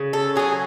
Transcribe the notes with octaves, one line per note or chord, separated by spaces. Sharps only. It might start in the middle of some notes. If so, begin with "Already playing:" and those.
Already playing: C#3
A4
F#3 C#4 G#4